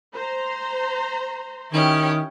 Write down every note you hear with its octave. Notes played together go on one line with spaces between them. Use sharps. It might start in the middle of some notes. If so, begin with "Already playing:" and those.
C5 A#5 C6
D#3 C#4 E4 G4